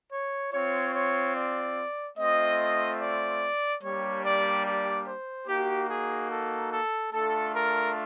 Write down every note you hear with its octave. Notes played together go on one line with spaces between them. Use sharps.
C#5
C4 F4 C#5
C#5
D5
A3 C4 F4 D#5
D5
G3 A#3 D4 G4 C#5
D5
D5
C5
A#3 D#4 F#4 G4
G#4
A4
A4
A3 D4 F4 A4
A#4